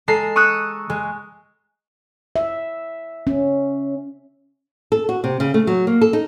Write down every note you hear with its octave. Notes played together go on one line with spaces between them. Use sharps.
G#3 A4 A#5 C7
C#6 D#6 E6 F#6 C#7
G#3
E5
C#4
A4
F#4
C3
C#3
A3
F#3
A#3
A4
D#4